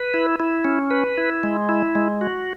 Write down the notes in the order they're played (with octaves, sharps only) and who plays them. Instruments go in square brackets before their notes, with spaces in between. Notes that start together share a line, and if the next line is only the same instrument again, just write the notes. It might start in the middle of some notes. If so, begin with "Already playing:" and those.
Already playing: [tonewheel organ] B4
E4
E4
C#4
B4
E4
G#3
E4
G#3
F#4